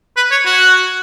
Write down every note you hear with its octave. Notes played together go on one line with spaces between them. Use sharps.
B4
C#5
F#4